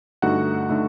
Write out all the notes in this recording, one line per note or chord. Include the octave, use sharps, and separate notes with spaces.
G2 D3 A3 D#4 F#4 F#5
D3 A3 D#4